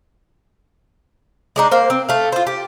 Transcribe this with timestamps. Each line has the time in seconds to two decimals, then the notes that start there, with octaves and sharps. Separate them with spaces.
1.56 G#3 D4 D#4
1.71 A#3 C5
1.90 C4
2.09 A3 F5
2.32 F4 C5
2.47 G4